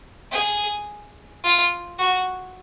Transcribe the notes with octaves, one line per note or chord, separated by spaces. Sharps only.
G#4
F4
F#4